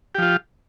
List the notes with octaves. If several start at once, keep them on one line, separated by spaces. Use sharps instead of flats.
F3 F4 G4